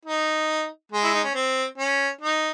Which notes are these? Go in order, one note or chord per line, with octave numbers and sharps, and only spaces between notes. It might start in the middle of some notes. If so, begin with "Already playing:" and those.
D#4
G#3
E4
D#4
C#4
C4
C#4
D#4